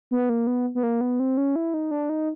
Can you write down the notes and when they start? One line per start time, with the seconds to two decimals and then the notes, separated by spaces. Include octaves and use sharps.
0.11 B3
0.29 A#3
0.47 B3
0.75 B3
0.83 A#3
1.01 B3
1.20 C4
1.37 C#4
1.56 E4
1.74 D#4
1.91 D4
2.09 D#4